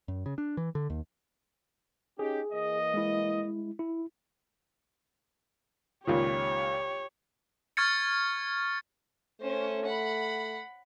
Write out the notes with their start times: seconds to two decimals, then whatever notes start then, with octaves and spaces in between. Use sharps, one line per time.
0.08 F#2
0.26 C#3
0.38 D4
0.57 E3
0.75 D3
0.90 D#2
2.19 C#4 D#4 G4 G#4
2.53 E3 A#3 D#5
2.94 G#3 E4
3.79 E4
6.07 C#2 A#2 D#3 G4 C#5
7.77 C#6 F6 G#6 A6 C#7
9.41 A3 C#4 C5
9.85 F#5 B5